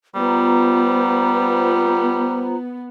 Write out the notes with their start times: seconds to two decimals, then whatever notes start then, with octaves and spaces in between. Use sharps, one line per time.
0.15 G3 B3 F4 C5 A#5